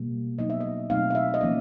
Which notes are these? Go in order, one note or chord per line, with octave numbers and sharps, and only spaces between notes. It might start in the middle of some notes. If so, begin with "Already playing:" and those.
Already playing: B2 G3 A#3
F#3 B3 D#4 D#5
E5
D#5
B2 F#3 A3 C4 D#4 F5
F5
E5
D#5
F3 A#3 C#4 D5